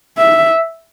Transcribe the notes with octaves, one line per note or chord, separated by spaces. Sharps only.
E5